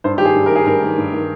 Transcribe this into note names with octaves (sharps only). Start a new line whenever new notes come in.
G2 C5
D#3 G4
G#4
G2
A#4
D#3 G#4
G2 A#4
D#3
G2
D#3